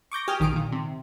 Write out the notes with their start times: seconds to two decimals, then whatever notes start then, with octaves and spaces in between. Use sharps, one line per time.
0.11 C#6 D6 G6 A#6
0.28 G4 G#5 D#6 F6
0.40 A#1 D#3 D#6 F6 D7
0.53 A#2 D#3
0.72 C3